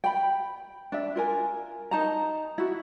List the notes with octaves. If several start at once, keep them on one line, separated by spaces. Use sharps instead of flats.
G5 B5
D4 E5
F4 A#4 G#5
D#4 A5 A#5
E4 F#4